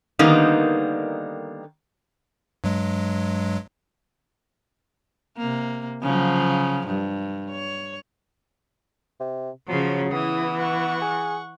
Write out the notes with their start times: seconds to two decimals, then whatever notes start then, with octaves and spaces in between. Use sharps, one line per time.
0.19 D3 D#3 G3 A#3 B3 D#4
2.64 G2 F#3 G#3
5.37 C3 A#3
6.02 C#3 F3 F#3
6.87 G2
7.50 C#5
9.20 C3
9.68 C#3 F3 F#3
10.12 E3 B3 E4 D#6
10.59 F#5 C#6
11.02 G#4